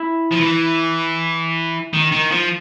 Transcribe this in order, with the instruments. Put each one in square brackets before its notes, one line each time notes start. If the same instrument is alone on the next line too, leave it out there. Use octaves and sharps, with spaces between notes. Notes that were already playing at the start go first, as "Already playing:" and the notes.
Already playing: [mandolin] E4
[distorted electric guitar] F3
E3
D#3
D#3
F3